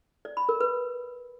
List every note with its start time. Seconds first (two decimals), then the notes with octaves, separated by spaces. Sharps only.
0.25 D5
0.37 B5
0.49 A#4
0.60 B4